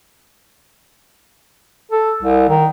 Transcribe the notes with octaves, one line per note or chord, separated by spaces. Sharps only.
A4
C2
D#3